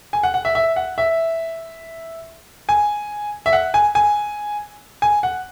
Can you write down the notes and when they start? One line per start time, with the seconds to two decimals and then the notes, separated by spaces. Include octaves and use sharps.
0.13 G#5
0.23 F#5
0.34 F#5
0.45 E5
0.55 E5
0.76 F#5
0.98 E5
2.69 G#5
3.46 E5
3.53 F#5
3.74 G#5
3.95 G#5
5.02 G#5
5.23 F#5